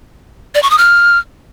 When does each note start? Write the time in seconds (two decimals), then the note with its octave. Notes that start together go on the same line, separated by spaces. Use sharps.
0.55 D5
0.63 C#6
0.70 D#6
0.78 F6